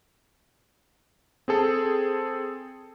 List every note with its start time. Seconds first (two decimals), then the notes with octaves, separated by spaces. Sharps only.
1.48 C4 G#4 A4